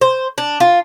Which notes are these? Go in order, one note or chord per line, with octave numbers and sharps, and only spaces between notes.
C5
D4
F4